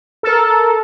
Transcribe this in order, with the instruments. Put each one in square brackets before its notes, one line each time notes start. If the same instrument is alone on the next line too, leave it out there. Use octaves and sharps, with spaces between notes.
[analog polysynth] A4 A#4